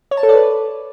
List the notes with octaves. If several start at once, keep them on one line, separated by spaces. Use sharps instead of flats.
C#5
A5
A4
D5
B4